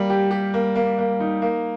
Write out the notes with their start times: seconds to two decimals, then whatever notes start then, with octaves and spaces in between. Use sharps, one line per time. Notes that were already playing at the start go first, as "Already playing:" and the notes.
Already playing: G3 A#3
0.10 G4
0.31 G4
0.54 A#3
0.75 A#3
0.99 A#3
1.20 D#4
1.42 A#3